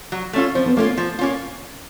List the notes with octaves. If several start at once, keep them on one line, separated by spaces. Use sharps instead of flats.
F#3
A3 C#4 F4
F3 C4
B3
A3 A#3 C#4 F4
F3
A#3 C#4 F4